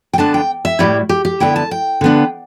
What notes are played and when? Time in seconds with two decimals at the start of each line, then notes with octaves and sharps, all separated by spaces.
0.13 G5
0.18 D3 B3 D4 A5
0.34 G5
0.65 E5
0.79 A2 G3 E4 G4
1.09 G4
1.25 G4
1.40 D3 B3 E4 G5
1.56 A5
1.71 G5
2.01 D3 B3 D4